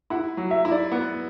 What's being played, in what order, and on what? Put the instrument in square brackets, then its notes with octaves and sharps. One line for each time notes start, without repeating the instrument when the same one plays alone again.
[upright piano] E4 [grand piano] F#5
[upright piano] F#3
[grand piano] E5
[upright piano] E4
[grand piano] D5
[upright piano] B3